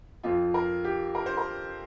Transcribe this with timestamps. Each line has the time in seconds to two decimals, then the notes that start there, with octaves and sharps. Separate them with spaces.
0.23 F2 F3 C4 F4
0.54 A#4
0.84 G4
1.15 A#4
1.26 C5
1.37 A#4